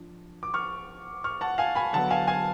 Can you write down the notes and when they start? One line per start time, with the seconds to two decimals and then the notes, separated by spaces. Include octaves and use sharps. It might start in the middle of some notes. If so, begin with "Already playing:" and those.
Already playing: F3 D4
0.43 D6
0.54 C#6 F6
1.24 C#6 F6
1.41 F#5 A5
1.58 F5 G#5
1.75 G#5 B5
1.93 D3 F#3 B3 F#5 A5
2.11 F5 G#5
2.28 F5 G#5